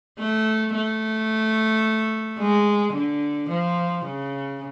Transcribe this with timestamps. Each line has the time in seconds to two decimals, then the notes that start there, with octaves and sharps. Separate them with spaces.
0.19 A3
0.74 A3
2.39 G#3
2.94 D3
3.49 F3
4.05 C#3